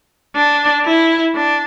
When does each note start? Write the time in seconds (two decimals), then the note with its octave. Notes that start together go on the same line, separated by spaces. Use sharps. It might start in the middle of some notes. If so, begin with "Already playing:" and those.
0.35 D4
0.85 E4
1.36 D4